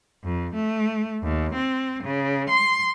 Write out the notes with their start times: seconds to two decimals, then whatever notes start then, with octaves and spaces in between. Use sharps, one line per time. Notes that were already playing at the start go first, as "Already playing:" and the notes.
0.23 F2
0.54 A3
1.23 D#2
1.54 C4
2.03 C#3
2.48 C6